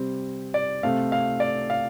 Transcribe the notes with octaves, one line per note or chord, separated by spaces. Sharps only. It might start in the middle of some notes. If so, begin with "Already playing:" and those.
Already playing: C3 G3 C4
D5
C3 A3 C4 F5
F5
D5
F5